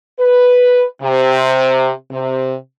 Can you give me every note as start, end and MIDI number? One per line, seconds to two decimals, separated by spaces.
0.19 0.84 71
1.02 1.91 48
2.11 2.54 48